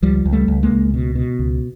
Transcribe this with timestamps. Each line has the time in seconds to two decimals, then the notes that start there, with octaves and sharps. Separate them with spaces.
0.03 C#2 F3 G3
0.25 C#2
0.32 G3 A3
0.48 C#2
0.63 G#3 A#3
0.71 C#2
0.94 B2
1.15 B2
1.39 C#2